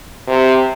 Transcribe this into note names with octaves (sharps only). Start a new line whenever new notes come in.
C3